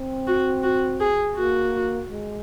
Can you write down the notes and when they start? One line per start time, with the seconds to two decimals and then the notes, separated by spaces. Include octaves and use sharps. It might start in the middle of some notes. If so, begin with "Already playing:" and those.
Already playing: C4
0.27 F#4
0.63 F#4
1.00 G#4
1.36 A#3 F#4
2.10 G#3